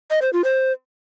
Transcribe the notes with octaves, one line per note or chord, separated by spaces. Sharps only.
D#5
C5
F4
C5